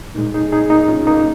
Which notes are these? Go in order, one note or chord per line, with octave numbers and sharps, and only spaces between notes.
A#2 G#3 A#3 D#4
D#4 G#4
D#4 G#4
A#3 D#4
C#4 F4
A#3 D#4